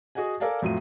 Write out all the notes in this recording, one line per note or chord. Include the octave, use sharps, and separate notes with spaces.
F#4 G#4 D#5 F#5 G#5
A4 A#4 D5 F5 G#5 A5
F2 A2 F#3 F4 D#7